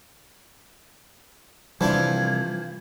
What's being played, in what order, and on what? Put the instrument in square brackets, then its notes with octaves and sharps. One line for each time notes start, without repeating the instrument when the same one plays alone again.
[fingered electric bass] C3 G3 [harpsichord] E3 D4 F4 [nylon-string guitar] F3 E4 [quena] G#6